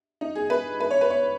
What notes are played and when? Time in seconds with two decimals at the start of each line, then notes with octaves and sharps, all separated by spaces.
0.21 D#4
0.35 G#4
0.50 B4
0.80 B4
0.91 C#5
1.01 B4
1.10 C#5